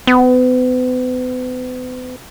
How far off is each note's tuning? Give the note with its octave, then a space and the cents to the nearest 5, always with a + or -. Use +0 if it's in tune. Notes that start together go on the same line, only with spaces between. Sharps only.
B3 +40